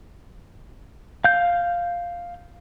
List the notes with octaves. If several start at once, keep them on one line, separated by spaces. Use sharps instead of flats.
F5 G6